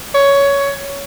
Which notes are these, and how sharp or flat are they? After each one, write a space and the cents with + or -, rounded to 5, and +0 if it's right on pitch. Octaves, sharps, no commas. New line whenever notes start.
C#5 +10